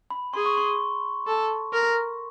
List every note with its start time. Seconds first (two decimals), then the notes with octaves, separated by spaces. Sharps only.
0.10 B5
0.34 G#4 C6
0.46 C#6
0.57 C6
1.27 A4
1.73 A#4